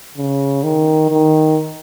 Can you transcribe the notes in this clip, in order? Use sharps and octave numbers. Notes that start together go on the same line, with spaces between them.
C#3
D#3
D#3